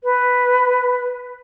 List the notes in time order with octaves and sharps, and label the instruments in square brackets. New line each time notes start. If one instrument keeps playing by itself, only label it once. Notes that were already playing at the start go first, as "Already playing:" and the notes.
[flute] B4